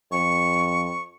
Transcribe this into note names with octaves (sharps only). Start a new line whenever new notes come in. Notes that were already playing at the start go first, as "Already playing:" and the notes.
F2 C#6